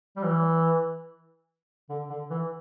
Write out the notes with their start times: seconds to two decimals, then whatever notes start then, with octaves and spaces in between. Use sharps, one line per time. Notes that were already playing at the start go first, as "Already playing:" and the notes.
0.16 G3
0.23 E3
1.90 D3
2.10 D3
2.30 E3